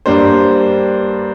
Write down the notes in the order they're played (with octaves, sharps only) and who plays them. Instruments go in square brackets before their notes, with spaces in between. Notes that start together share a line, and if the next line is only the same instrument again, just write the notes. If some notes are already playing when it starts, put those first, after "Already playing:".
[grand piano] G2 G3 A#3 D4 C5